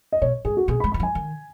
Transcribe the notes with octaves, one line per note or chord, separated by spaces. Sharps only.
D#5
B2 C#5
G#2 G#4
F#4
B2 G#4
B5
G#3
D#3 B5
F#3
G#5
D#3